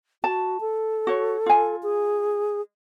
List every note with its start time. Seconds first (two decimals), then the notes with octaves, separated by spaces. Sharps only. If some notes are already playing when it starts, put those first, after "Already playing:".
0.24 F#4 A5
0.61 A4
1.07 F#4 C#5
1.46 F4 G#5
1.83 G#4